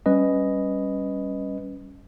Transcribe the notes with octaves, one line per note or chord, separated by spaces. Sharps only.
G3 C#4 B4 D#5